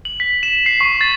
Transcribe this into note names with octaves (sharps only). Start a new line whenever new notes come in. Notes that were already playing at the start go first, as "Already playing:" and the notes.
F#7
B6
E7
C7
C#6
A6